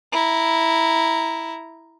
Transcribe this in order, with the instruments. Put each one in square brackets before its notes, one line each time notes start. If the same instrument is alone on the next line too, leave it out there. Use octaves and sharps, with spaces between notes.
[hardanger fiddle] E4 A#5